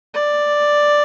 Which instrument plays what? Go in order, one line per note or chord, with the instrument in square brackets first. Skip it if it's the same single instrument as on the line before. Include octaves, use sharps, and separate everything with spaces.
[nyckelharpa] D5